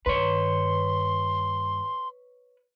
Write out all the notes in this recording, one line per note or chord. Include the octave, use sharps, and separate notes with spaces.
G2 D#3 B4 C#5 C6